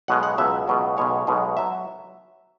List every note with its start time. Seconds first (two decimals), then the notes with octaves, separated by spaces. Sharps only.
0.08 B1 B2 G#3 F#5
0.23 F#5
0.38 C#2 B2 F#3 E5
0.68 C#2 B2 F#3
0.97 B1 B2 G#3 C#5
1.27 B1 B2 G#3
1.57 F#3 E5